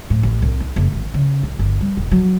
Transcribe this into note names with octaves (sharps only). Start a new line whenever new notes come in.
A2
A1
C2
D#4
F#1
G#1
C#3
C2
G1
G3
E1
F#3